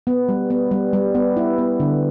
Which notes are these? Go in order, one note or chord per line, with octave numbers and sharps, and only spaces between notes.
B3
G3
B3
G3
G3
B3
E4
B3
D3